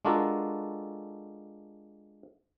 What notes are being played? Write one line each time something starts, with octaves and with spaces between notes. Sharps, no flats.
G#3 D4 F4 F#4 A4 A#4